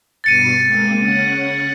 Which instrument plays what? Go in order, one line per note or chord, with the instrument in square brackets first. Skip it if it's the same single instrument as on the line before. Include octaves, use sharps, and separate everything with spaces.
[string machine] G2 B2 C7 [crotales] A6 C#7 D#7
[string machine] G#3 A#3 C4
C#3 C#4 F#5